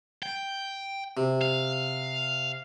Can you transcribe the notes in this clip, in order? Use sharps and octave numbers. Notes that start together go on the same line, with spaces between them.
G5
C3
F5